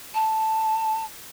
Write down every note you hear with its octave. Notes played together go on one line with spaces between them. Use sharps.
A5